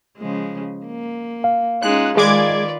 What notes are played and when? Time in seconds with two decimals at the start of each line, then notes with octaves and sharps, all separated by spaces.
0.18 C#3 F3 G#3
0.86 A#3
1.44 F5
1.82 G#3 C#4 D#4 F4 F#6
2.17 D#3 G#3 F4 B4 D5 D6 G#6